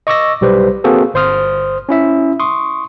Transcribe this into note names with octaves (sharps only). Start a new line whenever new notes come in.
D#5 C#6 D6 E6 A#6
B1 G3 G4 B4 C5
A#3 C4 F#4 G#4 A4
G1 C5 C6 D#6 F6
C#4 E4 E5
C6 C#6 D#6